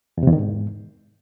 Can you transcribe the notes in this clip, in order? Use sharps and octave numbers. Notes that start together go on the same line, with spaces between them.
E2
C3
E2
D#3
G#2